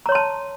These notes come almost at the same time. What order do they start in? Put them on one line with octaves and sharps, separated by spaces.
A#5 C#5 C6 A5